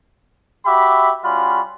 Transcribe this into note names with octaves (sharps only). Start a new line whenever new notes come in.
F#4 G4 E5 B5 D6
G3 C#4 F4 F#4 B5